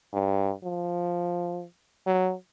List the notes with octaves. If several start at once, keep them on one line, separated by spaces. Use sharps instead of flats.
G2
F3
F#3